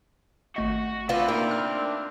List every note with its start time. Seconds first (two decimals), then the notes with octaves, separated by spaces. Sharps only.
0.56 G#1 A3 F#4 D#5
1.09 C4 D4 F4 B4 E5
1.28 A#3 D#4 A#4
1.51 F6